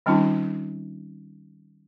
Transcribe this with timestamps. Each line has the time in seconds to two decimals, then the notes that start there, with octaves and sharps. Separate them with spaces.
0.06 D#3 G3 C4 C#4 D#4 F4